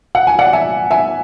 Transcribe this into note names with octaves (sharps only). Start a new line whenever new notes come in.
F#5
G#5
D5 F#5
E5 G#5
E5 G#5